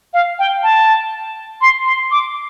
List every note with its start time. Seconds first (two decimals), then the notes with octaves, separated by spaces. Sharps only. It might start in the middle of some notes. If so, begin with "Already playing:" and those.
0.14 F5
0.39 G5
0.63 A5
1.61 C6
1.86 C6
2.11 D6